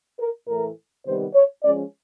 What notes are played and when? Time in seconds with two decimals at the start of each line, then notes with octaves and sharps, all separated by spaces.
0.19 A#4
0.48 A2 E3 A3 A#4
1.05 C3 D#3 G3 B3 D#4 C5
1.34 C#5
1.63 F3 G#3 C#4 D5